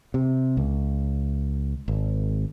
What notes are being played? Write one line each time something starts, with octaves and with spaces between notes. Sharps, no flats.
C3
C#2
G#1